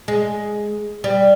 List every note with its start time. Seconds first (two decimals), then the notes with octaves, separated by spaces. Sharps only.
0.08 G#3
1.04 G3